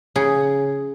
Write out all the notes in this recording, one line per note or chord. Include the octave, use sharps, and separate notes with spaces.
C#3 G#4